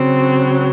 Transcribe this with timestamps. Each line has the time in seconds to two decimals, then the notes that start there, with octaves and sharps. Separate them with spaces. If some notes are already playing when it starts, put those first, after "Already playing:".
Already playing: C#3 F#3 C4